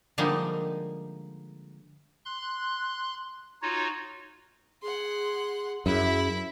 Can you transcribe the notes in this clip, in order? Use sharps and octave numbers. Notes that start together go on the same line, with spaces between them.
D3 F3 G3 G#3 A#3 D#4
C6 F#6
D#4 F4 F#4 C#5
G#4 F#5 C6
F#2 E4 G#4 E5